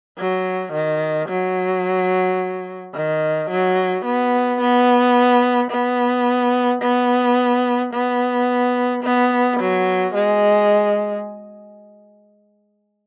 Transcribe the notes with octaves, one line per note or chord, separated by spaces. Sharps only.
F#3
D#3
F#3
D#3
F#3
B3
B3
B3
B3
B3
B3
F#3
G#3